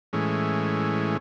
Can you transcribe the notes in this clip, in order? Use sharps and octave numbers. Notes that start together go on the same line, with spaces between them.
A2 E3 G#3 C#4